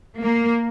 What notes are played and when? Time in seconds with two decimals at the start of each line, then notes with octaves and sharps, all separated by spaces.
0.22 A#3